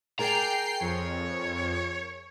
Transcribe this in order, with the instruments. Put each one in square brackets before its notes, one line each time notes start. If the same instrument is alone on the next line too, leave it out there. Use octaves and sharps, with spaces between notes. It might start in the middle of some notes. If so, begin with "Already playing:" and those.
[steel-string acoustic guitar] G#4 A#4 [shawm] D5 [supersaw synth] G5 C7 [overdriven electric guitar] A#5
[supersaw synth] F2 [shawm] C#5